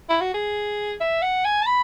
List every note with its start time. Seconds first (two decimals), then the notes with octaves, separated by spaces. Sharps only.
0.09 E4
0.21 F#4
0.34 G#4
1.00 E5
1.22 F#5
1.45 G#5
1.62 A5
1.67 B5